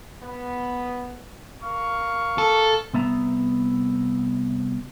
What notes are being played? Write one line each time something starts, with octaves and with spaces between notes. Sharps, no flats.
B3
A#4 F5 C#6
A4
C2 B3 E5 A#5